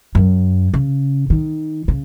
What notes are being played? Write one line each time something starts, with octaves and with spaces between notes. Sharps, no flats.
F#2
C#3
D#3
C#3